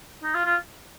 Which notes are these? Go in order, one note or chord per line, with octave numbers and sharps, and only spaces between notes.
D#4
F4
F4